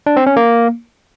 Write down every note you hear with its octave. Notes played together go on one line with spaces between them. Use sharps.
D4
C4
C#4
A#3